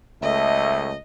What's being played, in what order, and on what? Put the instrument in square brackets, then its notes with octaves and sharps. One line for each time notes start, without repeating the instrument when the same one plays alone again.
[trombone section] C#2 A3 [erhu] D#5 [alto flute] E5